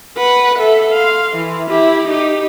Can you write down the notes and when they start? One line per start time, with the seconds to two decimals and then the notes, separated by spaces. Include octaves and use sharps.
0.17 B4 F#5
0.58 A4 E5
0.93 F5 C6
1.36 E3
1.71 E4 G4
2.08 D#4 G4